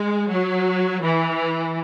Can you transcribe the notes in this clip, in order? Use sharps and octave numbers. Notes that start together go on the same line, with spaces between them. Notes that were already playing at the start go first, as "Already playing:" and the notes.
Already playing: G#3
F#3
E3